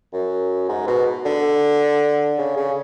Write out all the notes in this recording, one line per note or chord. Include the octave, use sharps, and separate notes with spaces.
F#2
G#2
B2
D3
C#3
C#3